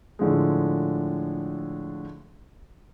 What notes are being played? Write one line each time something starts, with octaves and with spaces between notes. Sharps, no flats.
A2 D3 F3 G#3